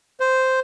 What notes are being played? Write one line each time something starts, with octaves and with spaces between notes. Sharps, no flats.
C5